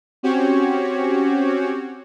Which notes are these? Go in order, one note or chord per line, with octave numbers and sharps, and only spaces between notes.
C4 C#4 F#4 G4 C#5